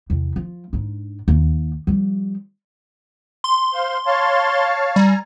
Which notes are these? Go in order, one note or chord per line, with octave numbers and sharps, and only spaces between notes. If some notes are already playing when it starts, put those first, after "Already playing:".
E2 C3
F3
G#2 D4
D#2
F3 G3
C6
C5 F5
C#5 F5 A5
G3 G#5 A#5